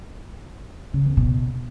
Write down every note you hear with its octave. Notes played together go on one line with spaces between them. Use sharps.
C#3
E2
B2